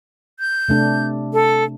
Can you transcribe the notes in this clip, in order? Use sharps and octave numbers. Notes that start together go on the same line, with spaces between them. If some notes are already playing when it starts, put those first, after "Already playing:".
G6
C3 A3 D4
A4